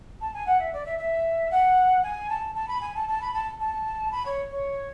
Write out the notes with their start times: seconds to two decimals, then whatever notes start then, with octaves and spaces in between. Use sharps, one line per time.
0.21 A5
0.34 G#5
0.46 F#5
0.59 E5
0.72 D5
0.85 E5
0.98 E5
1.51 F#5
2.03 G#5
2.29 A5
2.55 A5
2.68 B5
2.81 G#5
2.95 A5
3.08 A5
3.21 B5
3.33 A5
3.60 A5
4.11 B5
4.25 C#5
4.50 C#5